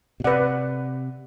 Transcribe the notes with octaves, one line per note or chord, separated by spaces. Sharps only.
B2
C3 B4 D5 F#5